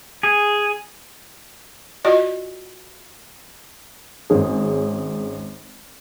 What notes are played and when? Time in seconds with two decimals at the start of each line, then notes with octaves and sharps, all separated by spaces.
0.23 G#4
2.05 F4 F#4 D5 D#5
4.30 G#1 C#4 G#4